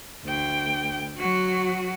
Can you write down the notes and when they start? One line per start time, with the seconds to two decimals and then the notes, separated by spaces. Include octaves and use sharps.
0.25 D2 G5
1.17 F#3 F#4